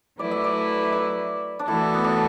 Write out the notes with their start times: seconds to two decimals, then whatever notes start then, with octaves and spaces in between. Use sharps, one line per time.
0.19 F#3 A3 E4 B4 D5
0.31 E5
0.44 D5
0.93 E5
1.59 D4
1.67 E3 A3 E4 F#4 A4
1.94 B3
2.04 D4